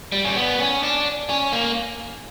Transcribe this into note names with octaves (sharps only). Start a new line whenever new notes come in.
G3
C#4
B3
C#4
D4
C#4
A#3